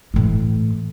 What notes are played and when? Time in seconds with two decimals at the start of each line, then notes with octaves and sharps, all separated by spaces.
0.14 A2 E3